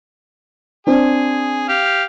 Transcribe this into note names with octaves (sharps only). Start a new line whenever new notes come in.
C4 D4 G#4
G4 F5